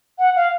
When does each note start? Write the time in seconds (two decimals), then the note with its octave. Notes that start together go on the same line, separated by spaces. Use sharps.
0.19 F#5
0.36 F5